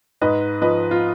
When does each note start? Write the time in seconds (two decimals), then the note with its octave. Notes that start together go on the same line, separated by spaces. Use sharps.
0.21 G#2 B4 D#5
0.62 F3 B4 D#5
0.91 F4